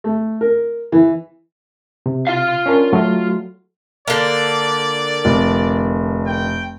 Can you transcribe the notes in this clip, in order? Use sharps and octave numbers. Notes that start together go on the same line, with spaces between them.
A3
A#4
E3
C3
F4 F5
C#4 D4 A#4
F#3 A3 F#4
D3 A#3 D5
F1
G5